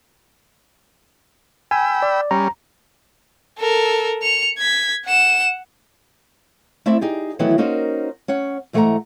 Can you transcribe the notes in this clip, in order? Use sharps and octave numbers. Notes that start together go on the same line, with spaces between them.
G5 G#5 B5 E6
D5
G3 C#4 A#5
A4 A#4
C#7 F7
G#6 B6
F#5 E7
A3 C4 E4 D5 E5
D#4 G4 G#4
D#3 E3 F#3 A3 B3 E4
A#3 C#4 D#4 F#4 A#4 C5
C#4 C#5 F#5
G#2 E3 A3 C5 F#5 A#5